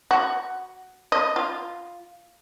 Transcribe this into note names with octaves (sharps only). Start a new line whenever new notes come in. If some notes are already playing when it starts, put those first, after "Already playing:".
F#4
D#5
F4